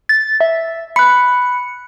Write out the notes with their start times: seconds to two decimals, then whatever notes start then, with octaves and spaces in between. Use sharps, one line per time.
0.09 A6
0.41 E5
0.96 B5 F#6 C#7